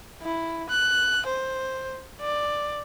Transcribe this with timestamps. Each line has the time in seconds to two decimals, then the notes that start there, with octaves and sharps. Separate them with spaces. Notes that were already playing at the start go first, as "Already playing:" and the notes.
0.22 E4
0.69 F#6
1.26 C5
2.21 D5